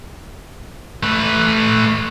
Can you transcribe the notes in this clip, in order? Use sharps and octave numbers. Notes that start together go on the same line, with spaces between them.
A3 B4